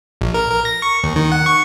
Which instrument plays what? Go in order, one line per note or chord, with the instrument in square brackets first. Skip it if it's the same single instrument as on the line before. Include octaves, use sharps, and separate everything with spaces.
[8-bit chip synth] A#1
A#4
A#4
A#6
C#6
D#2
D#3
F#5
C#6